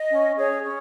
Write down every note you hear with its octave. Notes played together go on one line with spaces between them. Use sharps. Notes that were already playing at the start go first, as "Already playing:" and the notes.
Already playing: D#5
C#4
G#4 C#5
C#4